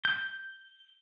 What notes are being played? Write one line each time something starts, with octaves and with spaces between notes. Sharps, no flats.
G6